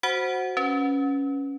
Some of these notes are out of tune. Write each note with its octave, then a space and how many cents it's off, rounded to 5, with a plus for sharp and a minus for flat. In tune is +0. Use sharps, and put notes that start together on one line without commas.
F#4 +0 C5 +0 F#5 +0
C#4 +0 B4 +0